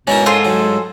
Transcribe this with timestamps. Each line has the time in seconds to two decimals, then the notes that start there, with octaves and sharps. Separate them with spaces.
0.07 G#2 B2 C#4 E4 A#4
0.26 F4 G#4 A4 C5
0.45 F#3